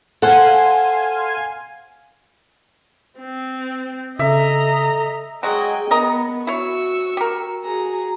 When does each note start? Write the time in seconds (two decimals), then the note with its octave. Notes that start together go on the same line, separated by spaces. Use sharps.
0.22 A4 C5 F5 F#5 G#5 C6
3.18 C4
4.19 C#3 A4 D#5 E5 A#5
5.43 F#3 G#3 F#4 G#4 D#5 G5
5.91 B3 A#4 D#5 A#5
6.47 E4 F#4 C#5 C#6 E6
7.17 G4 A#4
7.64 F#4 G#4 A#5